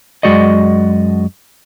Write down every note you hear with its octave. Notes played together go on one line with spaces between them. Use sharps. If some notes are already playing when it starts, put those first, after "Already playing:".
F#2 G#3 F#4 D5 D#5